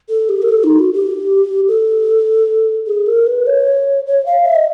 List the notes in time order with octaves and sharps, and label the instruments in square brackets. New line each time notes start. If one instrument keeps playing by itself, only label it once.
[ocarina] A4
G4
A#4
A4
D#4
F#4
G4
A4
G#4
A#4
B4
C#5
C#5
F5
E5
D#5